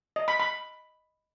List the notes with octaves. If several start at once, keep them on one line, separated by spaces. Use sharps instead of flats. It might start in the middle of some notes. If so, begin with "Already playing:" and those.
D#5
B5
B5